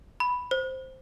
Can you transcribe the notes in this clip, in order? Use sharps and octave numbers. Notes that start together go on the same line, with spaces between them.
B5
C5